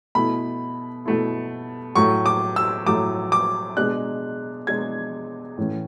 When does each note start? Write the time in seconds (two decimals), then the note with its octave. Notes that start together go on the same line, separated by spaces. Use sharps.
0.15 B2 A3 E4 B5
1.06 B2 A3 E4
1.95 A2 F#3 A3 C#6
2.26 D6
2.56 E6
2.86 A2 F#3 A3 D6
3.32 D6
3.77 B2 G#3 D4 F#6
4.67 B2 G#3 D4 G#6
5.58 A2 E3 A3 C#4